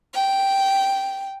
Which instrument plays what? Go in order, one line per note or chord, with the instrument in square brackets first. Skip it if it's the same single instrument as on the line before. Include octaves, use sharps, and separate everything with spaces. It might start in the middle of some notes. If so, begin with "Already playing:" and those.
[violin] G5